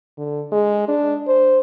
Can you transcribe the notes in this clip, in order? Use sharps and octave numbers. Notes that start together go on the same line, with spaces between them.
D3
G#3
D4
C5